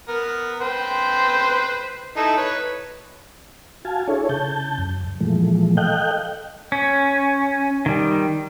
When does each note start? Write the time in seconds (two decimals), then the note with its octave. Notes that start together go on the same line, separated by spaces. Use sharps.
0.08 B3 A#4
0.61 B4 C5 G5
2.17 D#4 E4 A4
2.37 B4 C#5
3.85 F#4 F5 G#5 A5
4.08 D4 E4 G#4 A4 C#5
4.29 C#3 A5 G6
4.78 F#2
5.21 A#2 E3 F3 G#3 A3
5.77 A4 D#5 F5 G5 F#6 G6
6.72 C#4
7.86 D#3 G3